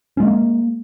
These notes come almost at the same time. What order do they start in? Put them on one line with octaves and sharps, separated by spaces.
C#4 G#3 A#3